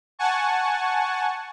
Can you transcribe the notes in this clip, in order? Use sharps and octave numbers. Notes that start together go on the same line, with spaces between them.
F#5 G#5 A5 C#6